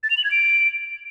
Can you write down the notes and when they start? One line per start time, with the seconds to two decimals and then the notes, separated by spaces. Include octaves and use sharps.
0.03 A6
0.10 F7
0.17 F#7
0.24 G#6
0.31 D7